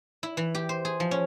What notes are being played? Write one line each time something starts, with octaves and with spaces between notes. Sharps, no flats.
E4
E3
G4
C5
G#4
F3
C#4